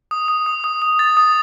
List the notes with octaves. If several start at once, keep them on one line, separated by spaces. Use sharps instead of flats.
D#6
D#6
D#6
D#6
D#6
A6
D#6